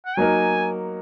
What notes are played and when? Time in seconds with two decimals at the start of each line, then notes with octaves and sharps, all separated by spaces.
0.06 F#5
0.17 F#3 A#3 D#4 A#4 G#5